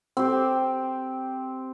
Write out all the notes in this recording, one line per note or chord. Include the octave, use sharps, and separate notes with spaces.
C4 G4